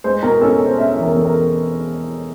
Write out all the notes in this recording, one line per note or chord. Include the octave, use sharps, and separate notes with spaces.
G#3 C5
B2 A#4
C#4 A4
C#4
C5
C#4 E5
E5
E2
A#4
E2 A4
A#4